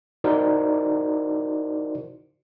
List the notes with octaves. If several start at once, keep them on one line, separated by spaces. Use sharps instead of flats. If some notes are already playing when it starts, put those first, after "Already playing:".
D#4 E4 F#4 A#4 C5 D5